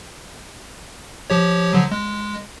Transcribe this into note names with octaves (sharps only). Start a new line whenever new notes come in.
F3 G4 C#5
D3 F3 F#3
G#3